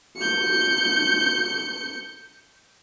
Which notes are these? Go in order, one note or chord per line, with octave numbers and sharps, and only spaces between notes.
G6 C#7